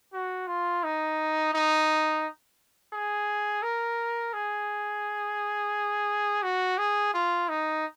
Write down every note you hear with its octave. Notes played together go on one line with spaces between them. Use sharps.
F#4
F4
D#4
D#4
G#4
A#4
G#4
F#4
G#4
F4
D#4